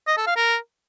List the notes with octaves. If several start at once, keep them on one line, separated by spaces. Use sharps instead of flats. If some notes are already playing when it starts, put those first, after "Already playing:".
D#5
A4
F5
A#4